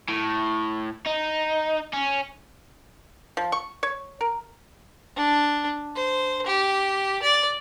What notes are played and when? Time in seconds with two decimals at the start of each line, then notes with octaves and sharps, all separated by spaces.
0.08 A2
1.06 D#4
1.93 C#4
3.37 F3
3.52 C#6
3.83 C#5
4.21 A#4
5.17 D4
5.96 C5
6.46 G4
7.23 D5